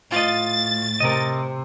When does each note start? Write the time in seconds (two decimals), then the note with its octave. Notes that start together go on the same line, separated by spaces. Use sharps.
0.12 A2 F4 D#5 A6
1.00 C3 A#4 D#5